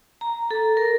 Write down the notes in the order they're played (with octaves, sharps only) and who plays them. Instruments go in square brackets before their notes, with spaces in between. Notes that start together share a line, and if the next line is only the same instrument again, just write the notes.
[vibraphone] A#5
A4
A#4